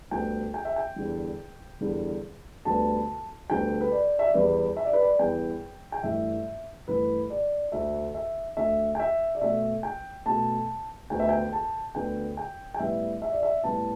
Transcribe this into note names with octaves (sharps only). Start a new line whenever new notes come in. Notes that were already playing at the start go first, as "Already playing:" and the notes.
D2 D3 G3 B3 G5
G5
E5
G5
E2 D3 G3
E2 D3 G3
D2 D3 G3 B3 A5
D2 D3 G3 B3 G5
B4
D5
E5
D5
E2 E3 G3 B3 B4
E5
D5
B4
D5
E2 E3 G3 B3 G5
G5
G2 E3 A3 E5
G2 E3 A3 B4
D5
D2 D3 A3 E5
E5
D2 D3 A3 E5
G5
E5
D5
B2 A3 E5
G5
B2 A3 A5
D2 D3 B3 G5
E5
G5
A5
D2 D3 B3 G5
G5
G5
A2 G3 B3 E5
E5
D5
E5
A2 G3 B3 A5